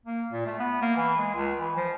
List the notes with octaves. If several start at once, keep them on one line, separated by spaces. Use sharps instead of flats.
A#3
A#2
A3
B3
A#3
E3
G#3
C#2
E3
F3